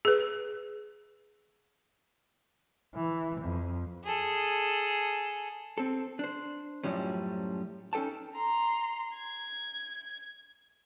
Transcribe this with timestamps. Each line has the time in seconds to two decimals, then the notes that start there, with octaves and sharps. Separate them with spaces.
0.05 G#4 B4
2.95 E3
3.41 F2
4.04 G#4 A4
5.78 C4 A4
6.19 D4 C5
6.84 F#2 A2 F3 G3 C#4
7.93 C#4 D#4 A4 G5 A5
8.35 A#5 C6
9.16 G#6